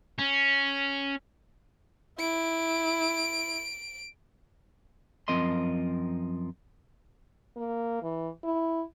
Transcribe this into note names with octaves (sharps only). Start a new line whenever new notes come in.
C#4
E4 D7
F#2 F3 C4 A#4 D#5 C6
A#3
E3
E4